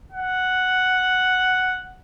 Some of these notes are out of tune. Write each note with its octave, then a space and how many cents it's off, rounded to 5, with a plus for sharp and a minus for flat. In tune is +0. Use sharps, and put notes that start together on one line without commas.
F#5 +0